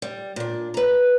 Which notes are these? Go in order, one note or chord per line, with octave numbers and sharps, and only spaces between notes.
G3
A#2 D4
B4 A#5